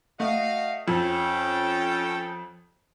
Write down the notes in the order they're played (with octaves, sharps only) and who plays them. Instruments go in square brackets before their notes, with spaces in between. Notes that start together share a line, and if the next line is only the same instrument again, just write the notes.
[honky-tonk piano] A3 [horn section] F#4 D#5 F5
[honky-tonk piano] F2 [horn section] C#4 A4 G5